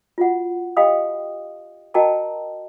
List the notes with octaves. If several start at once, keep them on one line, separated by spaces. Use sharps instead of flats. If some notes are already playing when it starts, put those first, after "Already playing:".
F4 F#4 F#5
G4 D#5 F5 G5 B5 D#6
F#4 A#4 D#5 G5 A5 A#5